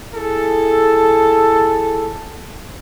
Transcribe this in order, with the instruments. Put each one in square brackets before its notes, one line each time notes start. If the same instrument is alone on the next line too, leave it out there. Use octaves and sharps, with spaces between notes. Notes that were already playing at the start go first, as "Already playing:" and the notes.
[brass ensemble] E4 G#4 A4